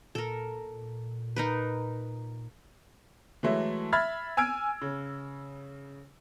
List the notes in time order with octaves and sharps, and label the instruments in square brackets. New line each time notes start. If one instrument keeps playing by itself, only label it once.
[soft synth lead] A#2 [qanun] A4 A#4
[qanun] D#4 A#4 B4
[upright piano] E3 F#3 G#3 A3 E4 A4
E5 B5 F6 G#6 A6
G#5 E6 F6 G#6 D7
C#3